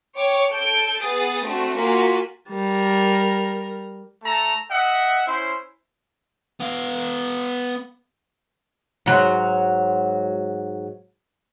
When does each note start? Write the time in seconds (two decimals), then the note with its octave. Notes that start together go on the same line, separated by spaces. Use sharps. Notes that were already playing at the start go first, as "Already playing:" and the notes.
0.17 C#5 G5 D6
0.51 A4 G6 D7
1.03 B3 G#4 D#6 A6
1.47 A3 C4 D4 F#4
1.79 A#3 F4 F#4 G#5 B6
2.49 G3 A#4
4.24 A3 A4 A5 A#5
4.71 D#5 E5 F#5
5.28 C#4 E4 C5
6.60 B3 F5
9.06 G#2 F#3